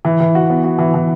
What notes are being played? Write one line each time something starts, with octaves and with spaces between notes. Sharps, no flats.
E3
E3
F#4
B3
F#4
E3
E3